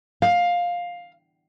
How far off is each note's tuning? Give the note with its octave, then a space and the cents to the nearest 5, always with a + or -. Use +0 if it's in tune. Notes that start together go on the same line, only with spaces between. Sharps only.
F5 +10